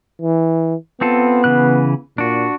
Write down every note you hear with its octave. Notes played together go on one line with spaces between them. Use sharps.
E3
B3 C4 F4 A4
C#3 E3 F#6
A#2 D4 F#4